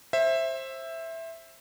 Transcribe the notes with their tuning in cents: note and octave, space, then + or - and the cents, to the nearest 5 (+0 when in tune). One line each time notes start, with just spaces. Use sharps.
C5 +25 E5 +0